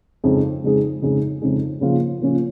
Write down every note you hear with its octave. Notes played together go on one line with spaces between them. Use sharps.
F2 C#3 G#3 D#4 G#4
F2 C#3 G#3 D#4 G#4
F2 C#3 G#3 D#4 G#4
F2 C#3 G#3 D#4 G#4
C#3 F3 A#3 C#4 F4
C#3 F3 A#3 C#4 F4